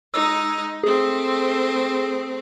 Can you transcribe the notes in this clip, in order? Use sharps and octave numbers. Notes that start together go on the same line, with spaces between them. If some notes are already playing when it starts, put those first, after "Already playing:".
G#3 D#4 E6
A3 C4 G#4